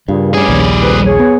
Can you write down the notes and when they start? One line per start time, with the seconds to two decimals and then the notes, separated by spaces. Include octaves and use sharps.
0.08 G2 A#2 C#3
0.34 E2 G3 C#4 G#4 G#5
0.48 A#1 D#2
0.82 F2 B4
1.06 G#4 C#5
1.19 B3